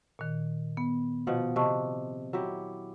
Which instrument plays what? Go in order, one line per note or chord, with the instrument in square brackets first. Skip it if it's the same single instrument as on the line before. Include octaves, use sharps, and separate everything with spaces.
[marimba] A#2 D#3
B3
[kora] B2 F3 F#5
[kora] C3 [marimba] D#5 A5 C#6
[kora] F#3 E4 G4